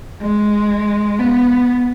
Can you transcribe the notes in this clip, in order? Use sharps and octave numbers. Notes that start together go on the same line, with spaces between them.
G#3
B3